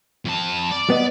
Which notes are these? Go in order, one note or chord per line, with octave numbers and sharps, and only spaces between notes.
F2 A5
D5
B3 D#5